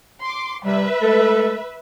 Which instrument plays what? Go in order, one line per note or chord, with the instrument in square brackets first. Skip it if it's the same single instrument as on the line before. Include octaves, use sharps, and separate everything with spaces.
[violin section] C6 D6
[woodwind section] C3 G3 [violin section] B4 E5
[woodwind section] G#3 A3 A4